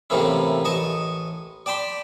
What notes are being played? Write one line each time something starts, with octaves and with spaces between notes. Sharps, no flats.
A2 C3 E3 A#3 C#4 E4
A1 D#5 A5 C#6
D5 G5 A5 B5 C6